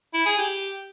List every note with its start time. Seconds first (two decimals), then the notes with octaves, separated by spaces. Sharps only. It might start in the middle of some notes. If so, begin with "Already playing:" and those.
0.14 E4
0.26 G#4
0.38 G4